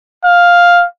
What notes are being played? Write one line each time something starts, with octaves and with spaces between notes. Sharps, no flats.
F5